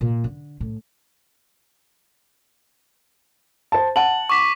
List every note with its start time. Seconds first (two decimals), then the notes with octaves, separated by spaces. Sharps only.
0.01 A#2
0.24 D3
0.60 A2
3.72 C5 A5
3.96 F#5 A5 F#7
4.30 C#6 D6 B6